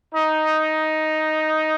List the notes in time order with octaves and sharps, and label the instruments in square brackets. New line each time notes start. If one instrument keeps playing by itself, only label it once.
[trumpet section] D#4